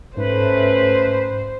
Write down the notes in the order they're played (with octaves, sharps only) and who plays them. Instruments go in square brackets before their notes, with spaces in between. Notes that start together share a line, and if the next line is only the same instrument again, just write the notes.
[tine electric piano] G#2 [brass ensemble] A3 C#4 [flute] B4 [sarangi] C5